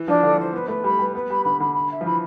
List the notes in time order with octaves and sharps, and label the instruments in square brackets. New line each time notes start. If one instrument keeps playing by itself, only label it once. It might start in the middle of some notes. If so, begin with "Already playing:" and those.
Already playing: [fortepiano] E3
[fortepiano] F3 [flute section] D4
[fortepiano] D3 [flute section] A4
[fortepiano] E3 [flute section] C5
[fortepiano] B3 [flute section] B4
[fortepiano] A3 [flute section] B4
[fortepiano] G3 [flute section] B5
[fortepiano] G3 [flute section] B4
[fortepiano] B3 [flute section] B4
[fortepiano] G3 [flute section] B5
[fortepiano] D3 [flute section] B5
[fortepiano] D3 [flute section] B5
[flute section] B5
E5
[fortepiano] F3
[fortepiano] E3 [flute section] B5